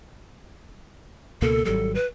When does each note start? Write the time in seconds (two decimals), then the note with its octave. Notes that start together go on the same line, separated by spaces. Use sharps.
1.42 C#2 B2 A#3 A4
1.65 G#1 F#3 G3 A4
1.95 B4